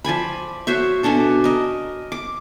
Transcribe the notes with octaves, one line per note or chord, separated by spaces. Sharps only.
F3 D5 G#5 B5
F#4 C5 C#5 E5
B2 C#4 D4 A4
A#4 D#5
D6